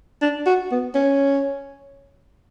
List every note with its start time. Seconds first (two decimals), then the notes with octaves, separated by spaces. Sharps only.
0.22 D4
0.46 F#4
0.72 B3
0.95 C#4